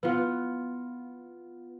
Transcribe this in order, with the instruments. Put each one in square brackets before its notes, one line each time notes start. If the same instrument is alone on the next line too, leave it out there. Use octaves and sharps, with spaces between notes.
[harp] B3 F4 [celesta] B4